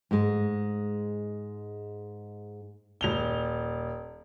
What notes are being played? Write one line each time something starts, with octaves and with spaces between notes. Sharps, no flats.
G#2 G#3
D#1 F7 G7